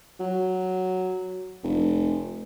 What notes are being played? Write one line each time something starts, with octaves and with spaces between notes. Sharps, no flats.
F#3
F1